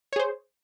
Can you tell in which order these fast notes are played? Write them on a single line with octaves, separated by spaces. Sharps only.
C#5 G#4 C5